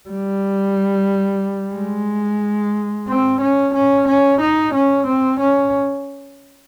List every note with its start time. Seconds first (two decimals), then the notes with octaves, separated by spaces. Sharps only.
0.09 G3
1.75 G#3
3.08 C4
3.41 C#4
3.74 C#4
4.08 C#4
4.40 D#4
4.74 C#4
5.06 C4
5.39 C#4